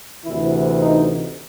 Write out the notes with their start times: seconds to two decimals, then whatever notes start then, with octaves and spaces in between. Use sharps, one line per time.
0.24 D2 C3 E3 E4
0.79 D#4